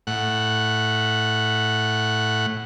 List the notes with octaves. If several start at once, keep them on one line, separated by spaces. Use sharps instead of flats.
A2 F#5